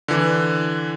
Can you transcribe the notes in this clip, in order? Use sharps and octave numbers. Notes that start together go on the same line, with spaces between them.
D3 E3